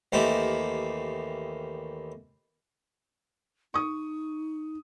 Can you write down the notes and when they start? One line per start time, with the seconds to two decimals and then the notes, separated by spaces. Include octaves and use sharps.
0.12 D#2 D#3 E3 A3 G4 C5
3.74 D#4 C#6 D#6